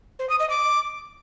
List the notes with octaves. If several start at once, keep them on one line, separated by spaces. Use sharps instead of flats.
C5
D#6
D#5
D6